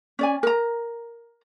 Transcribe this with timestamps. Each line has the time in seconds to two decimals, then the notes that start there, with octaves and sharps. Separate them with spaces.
0.19 C#4 D5 G#5
0.43 A#4 A#5